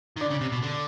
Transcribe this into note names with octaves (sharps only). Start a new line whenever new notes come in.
D#3
D3 D5
C#3
C3
B2
D3